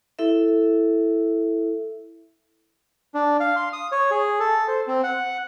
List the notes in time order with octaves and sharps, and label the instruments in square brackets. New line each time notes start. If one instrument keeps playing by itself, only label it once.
[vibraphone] E4 A4 E5
[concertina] D4
F5
C6
D#6
C#5
G#4
A4
C5
C4
F#5